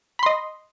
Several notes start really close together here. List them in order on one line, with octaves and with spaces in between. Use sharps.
B5 C6 D#5